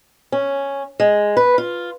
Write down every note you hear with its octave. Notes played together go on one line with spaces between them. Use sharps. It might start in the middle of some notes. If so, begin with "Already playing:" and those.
C#4
G#3
B4
F4